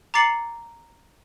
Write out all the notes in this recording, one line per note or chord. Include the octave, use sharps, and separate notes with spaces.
A#5 D6 A6 C7 C#7 F#7